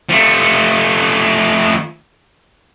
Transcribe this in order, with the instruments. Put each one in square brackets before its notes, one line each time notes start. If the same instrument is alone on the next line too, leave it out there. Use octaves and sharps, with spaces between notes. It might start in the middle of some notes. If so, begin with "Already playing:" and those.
[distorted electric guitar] F3 A3